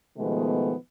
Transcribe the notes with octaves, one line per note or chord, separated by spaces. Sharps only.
B2 D#3 F3 G#3 A3 B3